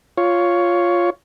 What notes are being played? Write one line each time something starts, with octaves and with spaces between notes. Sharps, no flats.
F4 C#5